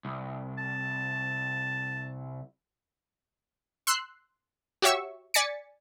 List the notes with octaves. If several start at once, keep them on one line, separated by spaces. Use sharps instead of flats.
C2
A5
C6 E6 F#6 C7
F#4 G4 C#5 E5 C#6 E6
D5 G#5 A6 B6 C#7